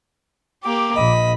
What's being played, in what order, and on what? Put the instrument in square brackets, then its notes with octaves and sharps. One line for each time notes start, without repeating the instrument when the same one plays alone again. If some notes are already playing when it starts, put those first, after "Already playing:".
[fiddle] A#3 G4 [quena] D6
[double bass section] A#1 [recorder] D#5 [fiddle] B5